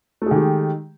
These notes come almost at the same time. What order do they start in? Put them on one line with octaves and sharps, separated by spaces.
A3 G#3 D#3 G4